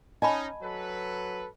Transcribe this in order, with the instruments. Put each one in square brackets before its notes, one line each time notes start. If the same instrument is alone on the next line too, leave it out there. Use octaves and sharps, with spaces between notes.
[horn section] C#4 D#4 [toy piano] D#5 A5 B5 [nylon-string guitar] G#5
[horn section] F#3 A4 B4